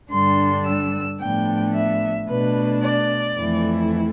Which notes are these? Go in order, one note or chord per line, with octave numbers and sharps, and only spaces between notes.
G2 D3 G3 D4 C6
E6
A2 F3 B3 D4 G5
E5
B2 A3 D4 B4
D5
F2 E3 A3 E4